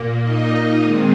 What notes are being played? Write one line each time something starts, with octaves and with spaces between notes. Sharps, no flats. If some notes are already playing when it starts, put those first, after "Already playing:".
Already playing: A#2 A#3
D#4 D#5
D#3 G#3 C4